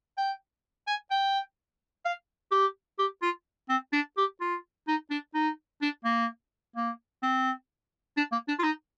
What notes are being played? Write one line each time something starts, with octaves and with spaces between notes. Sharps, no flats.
G5
G#5
G5
F5
G4
G4
F4
C4
D4
G4
F4
D#4
D4
D#4
D4
A#3
A#3
C4
D4
A#3
D4
F4
D#4